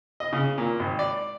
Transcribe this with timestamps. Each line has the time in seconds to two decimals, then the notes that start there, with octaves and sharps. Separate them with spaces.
0.20 D#5
0.33 C#3
0.58 A#2
0.80 G#1
0.99 D5